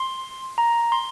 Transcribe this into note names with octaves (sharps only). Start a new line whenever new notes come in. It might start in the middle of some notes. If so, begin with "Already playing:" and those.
Already playing: C6
A#5
C6